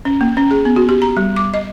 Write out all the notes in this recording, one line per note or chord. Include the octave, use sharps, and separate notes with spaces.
C#4
A#3
C#4
G#4
B3
F#4
G4
A#5
G3
D6
D#5